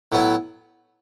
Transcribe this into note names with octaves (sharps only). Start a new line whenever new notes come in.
A2 F#3 B3 E4